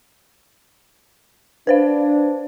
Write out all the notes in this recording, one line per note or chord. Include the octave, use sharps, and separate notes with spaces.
D4 B4 C5 F5